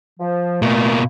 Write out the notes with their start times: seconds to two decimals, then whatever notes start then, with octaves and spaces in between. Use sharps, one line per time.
0.20 F3
0.62 B2 E3 A3 A#3